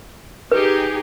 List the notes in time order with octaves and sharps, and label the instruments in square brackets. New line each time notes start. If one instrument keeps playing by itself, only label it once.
[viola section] D#4 G4 G#4 [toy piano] B4